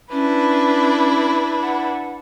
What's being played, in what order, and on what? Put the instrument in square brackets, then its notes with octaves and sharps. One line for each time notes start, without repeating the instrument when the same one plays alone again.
[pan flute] C#4 [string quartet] D4 E4 B4
[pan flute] F#5